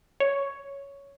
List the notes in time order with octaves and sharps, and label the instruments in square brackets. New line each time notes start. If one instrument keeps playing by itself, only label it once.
[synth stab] C#5